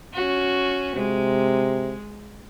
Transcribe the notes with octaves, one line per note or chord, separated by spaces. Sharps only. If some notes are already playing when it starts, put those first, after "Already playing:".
C#4 F#4
C3 G#3